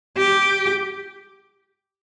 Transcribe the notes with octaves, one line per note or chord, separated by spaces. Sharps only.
G4